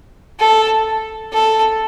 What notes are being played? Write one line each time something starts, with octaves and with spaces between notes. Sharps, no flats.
A4
A4